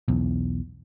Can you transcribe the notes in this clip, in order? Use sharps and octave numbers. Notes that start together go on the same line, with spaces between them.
B1 E2